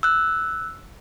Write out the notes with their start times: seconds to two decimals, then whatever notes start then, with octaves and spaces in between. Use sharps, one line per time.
0.03 E6 F#6